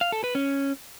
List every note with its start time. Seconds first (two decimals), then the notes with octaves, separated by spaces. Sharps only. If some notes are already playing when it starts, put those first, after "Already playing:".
0.01 F5
0.12 A4
0.24 B4
0.35 C#4